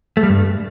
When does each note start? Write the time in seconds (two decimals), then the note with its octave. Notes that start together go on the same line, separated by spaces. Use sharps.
0.17 A3
0.23 G3
0.29 G2